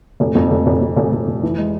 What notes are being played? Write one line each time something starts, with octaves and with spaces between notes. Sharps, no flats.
F1
F2
F1
F1
F1
F1
F1
F1
E3
G#3